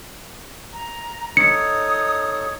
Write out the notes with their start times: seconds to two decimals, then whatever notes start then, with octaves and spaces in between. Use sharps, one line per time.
0.73 A#5
1.37 D#4 A4 C#5 D#6 C#7